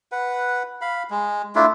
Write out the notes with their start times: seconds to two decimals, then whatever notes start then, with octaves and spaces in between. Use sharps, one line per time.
0.12 B4 F#5
0.81 F5 B5
1.10 G#3
1.55 A3 D4 E4 F4